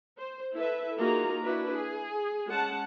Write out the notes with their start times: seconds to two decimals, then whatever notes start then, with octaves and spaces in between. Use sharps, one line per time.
0.19 C5
0.53 E4 A4 B4 E5
0.97 A#3 D#4 F4 F#4 G#4 A#5
1.43 D4 E4 F#4 B4
1.74 G#4
2.48 G#3 C#4 F#5 A5